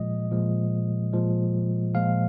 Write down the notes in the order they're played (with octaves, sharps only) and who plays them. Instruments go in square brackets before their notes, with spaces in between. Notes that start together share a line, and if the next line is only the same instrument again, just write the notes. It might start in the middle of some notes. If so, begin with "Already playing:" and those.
Already playing: [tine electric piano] A#2 F3 G#3 D#5
A#2 F3 G#3
A#2 F3 G#3
A#2 F3 G#3 F5